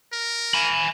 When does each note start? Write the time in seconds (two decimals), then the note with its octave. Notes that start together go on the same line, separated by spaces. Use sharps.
0.13 A#4
0.54 G#5 B5